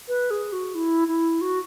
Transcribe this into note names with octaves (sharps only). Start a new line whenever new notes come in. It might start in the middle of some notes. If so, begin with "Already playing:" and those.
B4
G#4
F#4
E4
E4
F#4